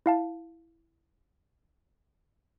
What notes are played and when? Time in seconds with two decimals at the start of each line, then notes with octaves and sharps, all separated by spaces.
0.06 E4 F5 A5